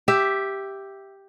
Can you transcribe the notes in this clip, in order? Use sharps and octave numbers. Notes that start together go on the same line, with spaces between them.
G4 E5